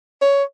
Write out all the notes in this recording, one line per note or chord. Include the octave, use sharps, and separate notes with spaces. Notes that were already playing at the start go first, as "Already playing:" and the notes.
C#5